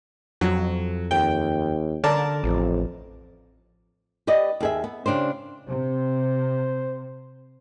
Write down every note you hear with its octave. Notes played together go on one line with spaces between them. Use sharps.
F2 F#3
D#2 G5
D3 A#4 D5 A5
A1 F2
G4 B4 D5 D#5
D#2 G#4 E5
B3
C#3 D4 G4 C5
C3 C5